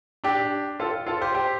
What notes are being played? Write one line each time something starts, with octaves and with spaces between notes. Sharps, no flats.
D4 G4
F4 A4
F4 A4
G4 C5
G4 C5